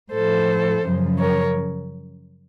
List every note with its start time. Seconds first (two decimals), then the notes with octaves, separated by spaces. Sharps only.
0.12 A2 F3 A4 C5
0.85 F#2 C#3 F3
1.20 A#4 C#5